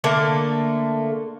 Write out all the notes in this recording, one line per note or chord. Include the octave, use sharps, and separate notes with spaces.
D3 A3 A#3